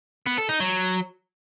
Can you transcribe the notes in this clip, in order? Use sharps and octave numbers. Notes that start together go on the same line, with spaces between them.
B3
A4
D#4
F#3